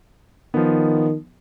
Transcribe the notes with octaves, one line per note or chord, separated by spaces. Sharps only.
D#3 F3 B3